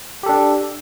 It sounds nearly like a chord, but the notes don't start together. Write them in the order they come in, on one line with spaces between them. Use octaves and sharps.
G4 A4 D4